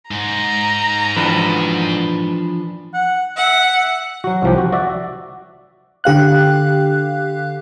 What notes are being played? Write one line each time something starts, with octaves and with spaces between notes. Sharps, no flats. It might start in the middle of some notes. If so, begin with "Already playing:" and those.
G#2 A#5
E3 F3 D4 B4
F#5
E5 F#5
F#3 F#4
C2 F3 G4
F#4
F#4 D5 E5
D3 G4 F5 F#6